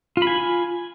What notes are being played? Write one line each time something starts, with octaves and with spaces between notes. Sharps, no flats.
F4 G#5 B5